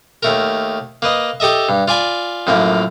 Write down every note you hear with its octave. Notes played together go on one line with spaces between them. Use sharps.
D#2 A3 A#4
A#3 B4 D#5
G4 A4 D#5 E5
G2
F4 D5 G#5 B5
F#2 A2 F3 A#3